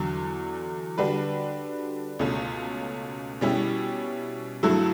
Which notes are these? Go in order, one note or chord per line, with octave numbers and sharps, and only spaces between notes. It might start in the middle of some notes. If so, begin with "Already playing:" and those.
Already playing: E2 D3 F#3
D3 G3 D4 F#4 B4
C#2 B2 A3 C#4
B2 G3 C#4 E4 G4
G2 F#3 A3 E4